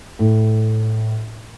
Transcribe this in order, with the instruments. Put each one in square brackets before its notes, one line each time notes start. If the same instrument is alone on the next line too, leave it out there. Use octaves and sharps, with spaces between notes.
[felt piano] A2